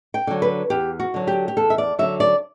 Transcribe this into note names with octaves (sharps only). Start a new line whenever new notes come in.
G5
D3 F#3
B4
E2 G4
F#4
D3 F#3
G4
G4
E2 A4
E5
D5
D3 F#3 E5
D5